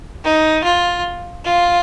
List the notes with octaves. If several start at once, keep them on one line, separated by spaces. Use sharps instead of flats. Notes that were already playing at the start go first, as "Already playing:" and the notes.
D#4
F4
F4